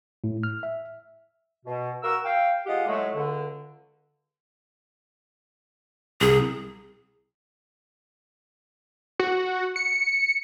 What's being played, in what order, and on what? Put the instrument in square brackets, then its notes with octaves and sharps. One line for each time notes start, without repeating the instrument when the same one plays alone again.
[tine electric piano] A2
F6
E5
[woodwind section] B2
F#4 A#4 E6
F5 G5
G#3 F4 G4 D#5 F#5
A2 F#3 G#3 A3
C#2 D3
[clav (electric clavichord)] C2 [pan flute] G#4
[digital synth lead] F#4
C#7